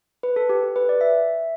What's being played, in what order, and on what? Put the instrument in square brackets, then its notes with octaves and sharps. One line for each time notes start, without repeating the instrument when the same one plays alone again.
[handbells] B4
A4
G4
A4
B4
D5
E5